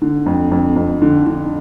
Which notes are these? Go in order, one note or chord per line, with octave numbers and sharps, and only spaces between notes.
D3
F2
F2
F2
D3
D3